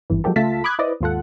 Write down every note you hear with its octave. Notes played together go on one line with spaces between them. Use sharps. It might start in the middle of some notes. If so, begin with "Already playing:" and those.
G#1 E2 G2 E3
F3 F#3 G#3 A#3 G4 A4
C#2 A3 F4 E5 A5 B6
B5 D6 D#6 F#6 G#6
E4 B4 C5 D5 D#5
D#2 G#2 F4 A4 F#5